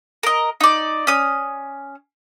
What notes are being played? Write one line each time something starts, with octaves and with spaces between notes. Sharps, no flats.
A#4 D#5
D#4 D5
C#4 D#6